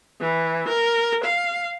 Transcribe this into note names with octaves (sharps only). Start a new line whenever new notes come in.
E3
A#4
F5